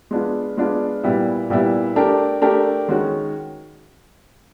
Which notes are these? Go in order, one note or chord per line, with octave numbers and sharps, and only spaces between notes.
G#3 B3 D4 F4
G#3 B3 D4 F4
A#2 G3 B3 E4
A#2 G3 B3 E4
A3 D4 G4 A#4
A3 D4 G4 A#4
D#3 G#3 C#4 F#4